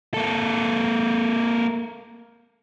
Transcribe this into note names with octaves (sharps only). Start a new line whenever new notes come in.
A#3 A4